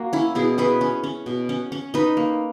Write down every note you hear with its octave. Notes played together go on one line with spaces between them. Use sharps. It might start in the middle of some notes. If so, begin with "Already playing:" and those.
Already playing: A#3 F#4
C#4 E4
B2 E4 G#4
C#4 G#4 B4
C#4
C#4
B2
C#4
C#4
D#4 B4 D#5
A#3